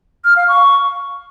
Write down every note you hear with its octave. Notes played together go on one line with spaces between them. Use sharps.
F6
F5
C#6